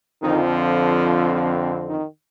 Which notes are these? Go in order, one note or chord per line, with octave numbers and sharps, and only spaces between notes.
F2 D3 D#3 F3 C4 D#4
F3 F4
D#3 D#4